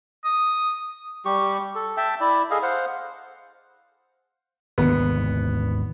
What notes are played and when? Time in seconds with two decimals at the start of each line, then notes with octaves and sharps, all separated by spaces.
0.25 D#6
1.25 G3 G4 C#6
1.75 A4
1.97 E5 G5 A5
2.21 E4 D5
2.51 G#4 A4 D#5 F5
2.63 C5 F5 F#5
4.78 G#1 D#2 D3 B3